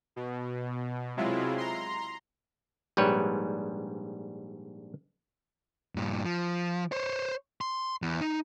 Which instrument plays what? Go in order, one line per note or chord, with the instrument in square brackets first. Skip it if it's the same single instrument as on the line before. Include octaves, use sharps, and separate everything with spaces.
[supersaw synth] B2
C3 F#3 G#3 E4 F4
A#5 C6
[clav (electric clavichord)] A#1 G#2 G3 B4 C#5 G5
[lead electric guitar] G2 A#2
F3
C5 C#5
C6
E2
D#4